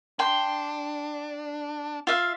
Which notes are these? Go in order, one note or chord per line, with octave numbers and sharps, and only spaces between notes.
D4 G5 C6
F4 E5 F5